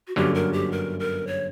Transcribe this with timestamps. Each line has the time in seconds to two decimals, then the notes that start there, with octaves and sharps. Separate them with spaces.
0.07 F#4
0.16 G1 F#2 D3 F#3 A#3 G4
0.34 A#4
0.53 G4
0.72 A#4
1.00 A#4
1.27 C#5